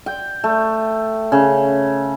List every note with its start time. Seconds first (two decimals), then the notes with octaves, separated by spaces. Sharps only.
0.06 G5
0.44 A3
1.32 C#3